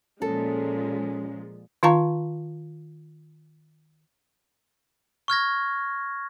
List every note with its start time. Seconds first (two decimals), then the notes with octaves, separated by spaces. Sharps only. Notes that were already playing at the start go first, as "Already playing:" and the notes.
0.22 A#2 F3 G#3 C#4 A4
1.83 D#3 F4 F5 A5 A#5 C#6
5.28 C#6 F6 G#6 A#6